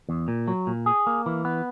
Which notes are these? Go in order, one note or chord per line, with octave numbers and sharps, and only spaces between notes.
E2
A#2
F#3
A#2
G#4
A#3
E3
B3